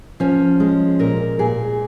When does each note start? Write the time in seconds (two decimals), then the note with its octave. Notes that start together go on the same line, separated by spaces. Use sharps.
0.20 F3 C#4
0.60 G#3
0.99 A#2 A#4
1.39 A#2 G#4